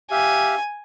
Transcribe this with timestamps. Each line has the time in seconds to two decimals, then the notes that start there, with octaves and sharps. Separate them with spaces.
0.11 G4 E5 F5 G#5